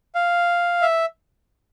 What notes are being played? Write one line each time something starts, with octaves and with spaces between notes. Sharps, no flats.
F5
E5